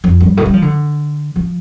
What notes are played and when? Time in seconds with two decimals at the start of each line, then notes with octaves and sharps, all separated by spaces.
0.04 F2
0.21 G2
0.37 A2
0.45 G3
0.53 F3
0.62 D3
1.36 F3